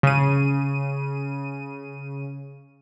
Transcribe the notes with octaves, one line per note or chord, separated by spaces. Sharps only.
C#3 D#7